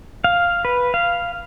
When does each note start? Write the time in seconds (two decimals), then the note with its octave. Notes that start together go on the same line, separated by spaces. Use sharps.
0.24 F5
0.65 B4
0.94 F5